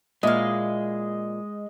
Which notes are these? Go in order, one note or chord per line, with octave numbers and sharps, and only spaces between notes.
A#2 G#3 E4 D#5 F5